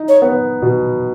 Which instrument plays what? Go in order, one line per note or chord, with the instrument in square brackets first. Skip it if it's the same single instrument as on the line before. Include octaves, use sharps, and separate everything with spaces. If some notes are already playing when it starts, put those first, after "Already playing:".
Already playing: [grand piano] D#4
[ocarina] C#5
[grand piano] B3
B2